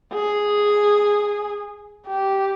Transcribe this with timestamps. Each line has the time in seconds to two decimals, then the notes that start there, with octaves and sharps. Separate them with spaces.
0.13 G#4
2.07 G4